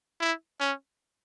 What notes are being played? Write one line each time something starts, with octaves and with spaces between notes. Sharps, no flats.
E4
C#4